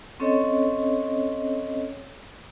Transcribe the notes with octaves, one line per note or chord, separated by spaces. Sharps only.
C4 C#4 A4 C#5 D#5